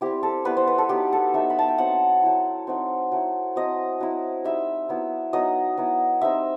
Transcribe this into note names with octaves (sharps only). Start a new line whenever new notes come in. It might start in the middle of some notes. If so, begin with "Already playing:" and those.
G3 C4 E4 G4
A4
G3 B3 E4 B4
C5
B4
A4
F#3 B3 D#4 G4
A4
F#3 A3 D#4 E5
B5
A5
G5
F#3 C4 D#4 F#5
F#3 A3 E4
F#3 A3 C4 D#4
F#3 A3 E4
F#3 C4 E4 D#5
F#3 C4 E4
G3 D#4 E5
F#3 B3 E4
F#3 B3 D#4 D#5
F#3 B3 E4
G3 C4 D#4 E5